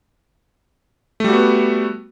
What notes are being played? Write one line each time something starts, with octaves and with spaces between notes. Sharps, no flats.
G3 A3 B3 F#4